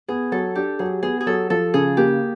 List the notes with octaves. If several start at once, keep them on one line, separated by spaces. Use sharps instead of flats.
B3 G#4
F#3 A4
D4 G4
F#3 G#4
B3 G#4
G#4
F#3 A4
F3 A4
C#3 G#4
A#3 G4